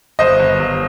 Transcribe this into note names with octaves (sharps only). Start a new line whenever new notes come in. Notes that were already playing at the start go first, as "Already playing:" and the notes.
G1 C5 D#5
G1
G1